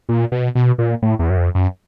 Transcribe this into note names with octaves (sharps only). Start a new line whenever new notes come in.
A#2
B2
B2
A#2
A2
E2
F#2
F2
F#2